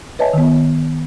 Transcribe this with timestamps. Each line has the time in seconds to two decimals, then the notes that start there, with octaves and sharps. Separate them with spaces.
0.19 B4 C#5 D#5 E5 G#5 A5
0.33 D#3 B3